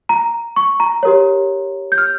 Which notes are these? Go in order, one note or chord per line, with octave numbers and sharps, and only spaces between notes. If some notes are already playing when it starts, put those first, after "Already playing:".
A#5
C#6
A#5
G4 A#4 C#5
G6
F6